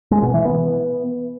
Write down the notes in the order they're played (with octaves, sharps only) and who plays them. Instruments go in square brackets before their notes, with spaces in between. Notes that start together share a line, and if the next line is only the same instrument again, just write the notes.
[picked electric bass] G#3
B2
E3
B3